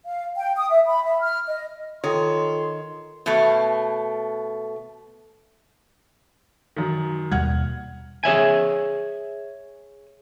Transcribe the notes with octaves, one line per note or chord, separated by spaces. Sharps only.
F5
G5
D#6
E5
B5
E5
F6
D#5
D#3 F4 A4 C#5 G5 C6
B2 A3
F#2 D#3
D#2 B2 G3 F#5 F6 G#6
G#4 C#5 E5 G#5